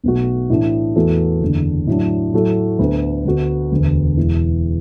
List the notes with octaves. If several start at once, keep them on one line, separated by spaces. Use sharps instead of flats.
B1 B2 A3 F#4
A2 E3 D4
E2 E3 A3 F#4 A4
F#1 E2 D3
A2 F#3 D4
A2 F#3 A3 F#4 A4
D2 D3 B3
D2 D3 B3 F#4
E1 D2 D3 B3
E1 E2 E3